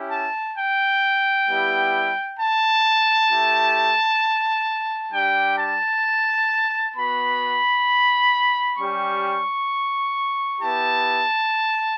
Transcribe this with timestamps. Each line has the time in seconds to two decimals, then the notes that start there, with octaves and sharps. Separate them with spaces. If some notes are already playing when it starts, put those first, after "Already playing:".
Already playing: C#4 E4 G4
0.11 A5
0.56 G5
1.48 G3 B3 E4 G4
2.39 A5
3.31 A3 E4 G4
5.12 G3 D4 G4 G5
5.58 A5
6.95 B3 F#4 B5
8.78 G3 C#4 G4 C#6
10.60 B3 E4 G4 A5